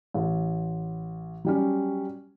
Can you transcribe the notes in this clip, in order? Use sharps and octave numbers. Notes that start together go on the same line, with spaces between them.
A1
F#3 G3 C#4